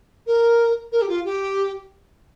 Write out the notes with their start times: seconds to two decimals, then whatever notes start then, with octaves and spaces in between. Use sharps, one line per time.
0.27 A#4
0.92 A#4
1.02 G4
1.09 F4
1.25 G4